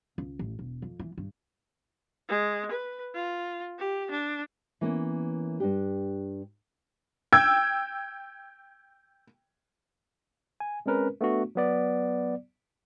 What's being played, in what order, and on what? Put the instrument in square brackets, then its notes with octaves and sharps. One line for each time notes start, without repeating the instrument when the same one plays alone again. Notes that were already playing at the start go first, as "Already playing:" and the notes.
[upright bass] C#2
A1
E1
F2
E3
G2
[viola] G#3
B4
F4
G4
D4
[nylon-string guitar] E3 A#3 B3 C#4
G2 D4 G4
[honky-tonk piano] G5 E6 G#6
[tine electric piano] G#5
G#3 C4 C#4 A#4 B4
A3 B3 D4 F#4
F#3 B3 D5